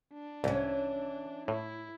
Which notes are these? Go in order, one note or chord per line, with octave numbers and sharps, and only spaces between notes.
D4
C2 E3 C#4
A2 E4